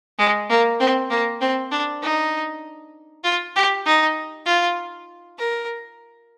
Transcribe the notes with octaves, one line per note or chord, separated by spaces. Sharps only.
G#3
A#3
C4
A#3
C4
D4
D#4
F4
G4
D#4
F4
A#4